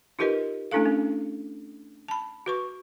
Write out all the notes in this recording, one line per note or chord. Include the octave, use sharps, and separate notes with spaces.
D#4 F4 G4 A#4 B4 D#5
A3 C#4 D4 E4 A4 F5
C#4
A5 B5
F#4 B4 C#6